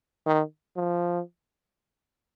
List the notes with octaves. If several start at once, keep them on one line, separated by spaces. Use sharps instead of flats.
D#3
F3